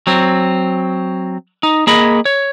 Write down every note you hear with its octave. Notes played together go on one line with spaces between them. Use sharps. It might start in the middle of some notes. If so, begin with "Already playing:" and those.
F#3 C4
D#4
A#3 G#4 D#5 B5
C#5